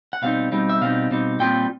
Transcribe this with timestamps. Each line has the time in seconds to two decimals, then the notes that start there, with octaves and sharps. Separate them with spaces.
0.13 F#5
0.22 B2 G3 C4 D#4 F5
0.52 B2 G3 C4 D#4
0.69 E5
0.81 B2 G3 C4 D#4 F5
1.11 B2 G3 C4 D#4
1.40 A#2 G3 C4 F4 G5